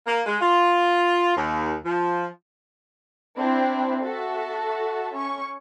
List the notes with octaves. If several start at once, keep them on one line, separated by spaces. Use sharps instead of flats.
A#3
G#3
F4
D#2
F3
C4 D4 E4
F#4 A4 E5 A5
C#4 C#6